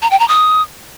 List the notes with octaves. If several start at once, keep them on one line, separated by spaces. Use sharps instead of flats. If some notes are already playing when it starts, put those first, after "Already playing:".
A#5
G5
A#5
D#6